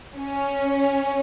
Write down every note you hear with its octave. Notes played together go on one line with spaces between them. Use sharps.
C#4